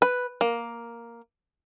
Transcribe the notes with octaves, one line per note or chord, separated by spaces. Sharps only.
B4
A#3